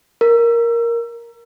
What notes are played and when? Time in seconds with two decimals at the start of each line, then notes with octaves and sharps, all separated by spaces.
0.21 A#4